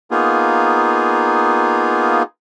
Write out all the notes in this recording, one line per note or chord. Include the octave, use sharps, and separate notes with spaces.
A#3 B3 D#4 F4 G#4